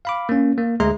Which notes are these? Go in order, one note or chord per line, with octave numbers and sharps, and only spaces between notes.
F5 B5 D6
A#3 C#4
A#3
D2 G#3 G#4 E5 A#5 C6